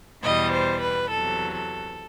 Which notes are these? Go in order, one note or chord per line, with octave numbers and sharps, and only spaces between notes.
E2 B2 G3 D#5
C5
B4
E2 C3 F#3 A4
A4